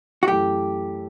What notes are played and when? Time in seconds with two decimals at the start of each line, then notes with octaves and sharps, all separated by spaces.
0.23 F#4
0.28 F#2 E3 A3 E4 G4